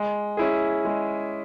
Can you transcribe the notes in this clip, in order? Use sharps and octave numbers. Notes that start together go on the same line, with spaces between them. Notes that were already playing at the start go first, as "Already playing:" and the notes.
Already playing: G#3
C#4 E4 G#4
G#3